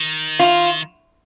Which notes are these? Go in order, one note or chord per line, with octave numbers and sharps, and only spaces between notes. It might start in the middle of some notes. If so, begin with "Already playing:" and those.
Already playing: D#3
F4